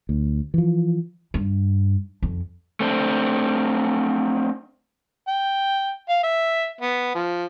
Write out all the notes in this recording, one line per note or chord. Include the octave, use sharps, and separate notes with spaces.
D2
E3 F3
G2
F2
A3 C4 D4
G5
F5
E5
B3
F3